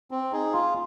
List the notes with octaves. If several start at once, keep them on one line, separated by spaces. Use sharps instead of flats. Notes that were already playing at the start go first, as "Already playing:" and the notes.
C4
D#4 G#4
F4